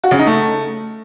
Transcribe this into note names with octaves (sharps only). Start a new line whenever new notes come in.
F#4
C#3
D#4
A3